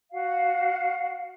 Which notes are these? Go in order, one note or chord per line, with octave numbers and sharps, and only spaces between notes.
F#4 F5 F#5